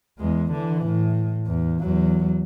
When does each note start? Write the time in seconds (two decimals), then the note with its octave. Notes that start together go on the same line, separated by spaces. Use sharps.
0.19 E2 G#3
0.52 D3 E3
0.86 A2
1.46 E2
1.80 E2 F#3